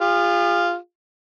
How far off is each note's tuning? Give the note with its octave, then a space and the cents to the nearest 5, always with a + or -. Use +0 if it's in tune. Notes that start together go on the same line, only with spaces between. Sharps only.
F4 +0 G#4 -45